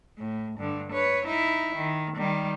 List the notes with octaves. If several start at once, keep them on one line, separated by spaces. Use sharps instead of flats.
A2
G2 D3
B4 C#5
D#4 E4
D#3
D#3 G3